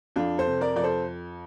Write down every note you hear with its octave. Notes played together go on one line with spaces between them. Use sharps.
F2 D4 F4
A4 C5
C3
A#4 D5
F2 D5
A4 C5